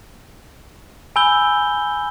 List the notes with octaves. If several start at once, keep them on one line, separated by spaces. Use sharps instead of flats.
G#5 B5 E6 G6 G7